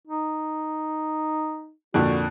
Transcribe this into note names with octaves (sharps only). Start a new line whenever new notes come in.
D#4
F2 A#2 D3 F#4